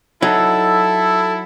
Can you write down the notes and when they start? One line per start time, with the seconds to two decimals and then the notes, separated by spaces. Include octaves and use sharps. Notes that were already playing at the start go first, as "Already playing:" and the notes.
0.22 F#3 D#4 E4 A4